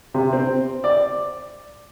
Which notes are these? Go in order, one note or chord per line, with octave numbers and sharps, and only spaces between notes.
C3
C4
D5